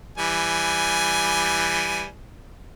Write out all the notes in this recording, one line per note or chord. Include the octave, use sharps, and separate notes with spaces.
E3 G3 G#5